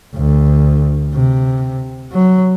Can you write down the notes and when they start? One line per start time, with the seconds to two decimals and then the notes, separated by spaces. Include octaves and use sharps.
0.15 D2
1.13 C3
2.13 F#3